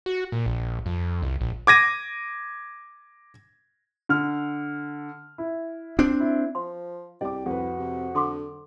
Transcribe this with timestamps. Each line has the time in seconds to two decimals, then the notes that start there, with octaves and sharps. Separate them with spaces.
0.06 F#4
0.32 A#2
0.46 A#1
0.86 F2
1.23 C2
1.41 A#1
1.67 D6 G#6 A#6 D#7
4.09 D3 F6
5.38 E4
5.99 C4 D4
6.20 E4
6.55 F3 C6
7.21 C2 G4 D5 D6
7.46 F2 F#4 B4
7.79 C3
8.15 D3 A4 C6 D6